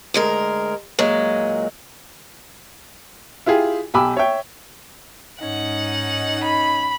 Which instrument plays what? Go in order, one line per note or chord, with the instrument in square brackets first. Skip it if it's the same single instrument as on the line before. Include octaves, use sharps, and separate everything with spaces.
[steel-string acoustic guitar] D2 G#3 A#4
A#2 F#3 G#3
[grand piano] E4 F4 G4 G#4
B1 G4 G#5 B5 D6 E6
C#5 E5 G5
[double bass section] G#2 [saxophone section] C#4 D#4 [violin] F#5
[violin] B5